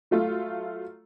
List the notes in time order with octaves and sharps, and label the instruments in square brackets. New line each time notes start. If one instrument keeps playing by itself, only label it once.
[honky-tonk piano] F#3 A3 F4